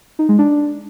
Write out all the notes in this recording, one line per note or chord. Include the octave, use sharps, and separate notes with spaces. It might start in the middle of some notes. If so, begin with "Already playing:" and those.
D#4
G#3
D4